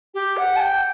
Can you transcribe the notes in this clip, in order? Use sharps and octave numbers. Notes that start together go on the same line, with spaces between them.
G4
F#5
A5
G5